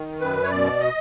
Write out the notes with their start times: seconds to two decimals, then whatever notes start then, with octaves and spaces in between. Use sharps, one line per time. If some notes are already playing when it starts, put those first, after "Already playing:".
Already playing: D#3
0.20 F#2 B4
0.43 C#5
0.50 B2 D5
0.80 D#5